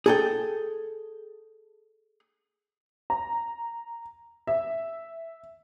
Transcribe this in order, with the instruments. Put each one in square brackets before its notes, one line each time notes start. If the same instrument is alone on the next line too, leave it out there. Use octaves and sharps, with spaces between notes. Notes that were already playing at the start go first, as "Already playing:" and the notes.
[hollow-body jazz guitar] G#4 A4 G5
[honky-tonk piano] A#5
E5